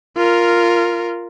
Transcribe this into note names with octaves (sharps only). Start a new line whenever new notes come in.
F4 A#4